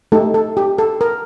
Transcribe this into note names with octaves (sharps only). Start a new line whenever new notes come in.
A3 D#4 G4 A4
A4
G4
A4
A#4